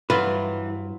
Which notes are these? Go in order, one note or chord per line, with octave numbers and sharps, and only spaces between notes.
G2 E3 F#3 F4 B4 C5